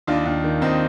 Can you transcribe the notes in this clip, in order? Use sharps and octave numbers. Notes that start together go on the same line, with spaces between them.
D#2 D4 F4
D#2
D#3
D#2 C4 D#4